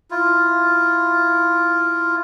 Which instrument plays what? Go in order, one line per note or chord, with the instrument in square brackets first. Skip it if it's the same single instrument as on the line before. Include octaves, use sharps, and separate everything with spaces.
[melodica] E4 F4